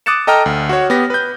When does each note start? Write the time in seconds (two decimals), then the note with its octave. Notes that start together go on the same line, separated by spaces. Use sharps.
0.06 D6 D#6 F#6 A6 C#7 E7
0.27 A4 D#5 G5 A#5 F6
0.46 D2
0.69 F#4 C#5
0.90 B3 G4 A#6
1.10 B4 G6